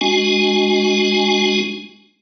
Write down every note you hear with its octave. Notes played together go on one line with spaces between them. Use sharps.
G#3 D4 F#4 G#5